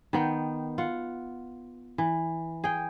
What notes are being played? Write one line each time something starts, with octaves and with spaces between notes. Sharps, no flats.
D#3 B3 G5
F4 F#5
E3
G#4 G5